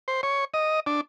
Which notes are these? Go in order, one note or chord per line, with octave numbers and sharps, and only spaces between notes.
C5
C#5
D#5
D4